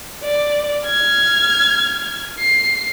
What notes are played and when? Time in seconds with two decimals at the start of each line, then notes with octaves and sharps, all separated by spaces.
0.24 D5
0.87 F6 G#6
2.39 C7